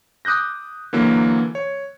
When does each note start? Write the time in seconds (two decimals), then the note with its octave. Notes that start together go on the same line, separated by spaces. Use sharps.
0.25 D6 D#6 F#6 G6 A#6
0.93 D3 E3 F#3 A#3
1.55 C#5